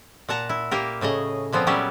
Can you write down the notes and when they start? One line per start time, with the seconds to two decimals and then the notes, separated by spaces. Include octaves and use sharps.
0.29 A#2 F#5 A5 A#5
0.49 E4
0.71 A#3 G4 A#4
1.01 A2 C#3 G#4 D#5
1.53 A#2 F3 B3 C4
1.67 F#3 G3 C#4 E4 G4 G#4